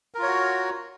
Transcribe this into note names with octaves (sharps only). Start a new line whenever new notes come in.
F4 F#4 A#4 C#5